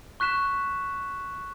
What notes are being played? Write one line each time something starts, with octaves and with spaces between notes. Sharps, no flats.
C#6 F#6 B6 E7